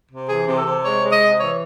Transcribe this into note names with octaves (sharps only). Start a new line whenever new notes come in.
C3
E3 G#4
C3
A4
C3
G#3 C#5
G#3
D#5
C3
E3 C#5